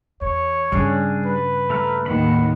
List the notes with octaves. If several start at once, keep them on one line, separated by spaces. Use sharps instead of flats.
E2 C#5
G2 C#3 G3 D4 G#4
B4
A3 A#5 F6
D#2 A2 D#3 F#5 B5